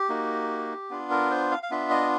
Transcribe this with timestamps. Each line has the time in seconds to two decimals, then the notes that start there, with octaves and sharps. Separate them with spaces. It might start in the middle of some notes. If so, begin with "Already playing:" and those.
Already playing: G4
0.09 A#3 D#4 F#4
0.90 B3 D4 F4
1.11 A#4
1.31 C5
1.51 F5
1.63 F5
1.70 B3 D4 F4 E5
1.90 D#5